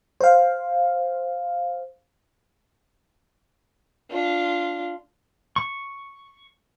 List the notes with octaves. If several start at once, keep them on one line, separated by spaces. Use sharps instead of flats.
C5 F5
D4 F4
C#6